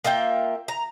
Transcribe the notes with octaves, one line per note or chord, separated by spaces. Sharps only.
A#3 F4 E5 G5
A#5